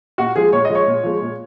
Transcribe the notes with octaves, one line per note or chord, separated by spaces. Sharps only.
A#2 F#4
F3 G#3 G#4
A#2 C#5
D#5
F3 G#3
C#5
A#2
F3 G#3
A#2